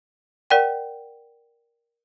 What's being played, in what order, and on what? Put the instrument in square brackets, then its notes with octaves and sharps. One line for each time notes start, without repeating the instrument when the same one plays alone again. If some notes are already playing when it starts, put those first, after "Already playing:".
[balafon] A#4 D5 F#5 G5